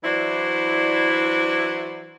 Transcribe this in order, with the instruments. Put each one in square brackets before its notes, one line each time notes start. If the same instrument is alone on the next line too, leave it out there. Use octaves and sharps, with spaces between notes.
[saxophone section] E3 F#3 D4 E4 C5 D5